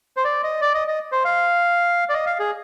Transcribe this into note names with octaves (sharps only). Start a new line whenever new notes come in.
C5
D5
D#5
D5
D#5
D#5
C5
F5
D5
D#5
F5
G#4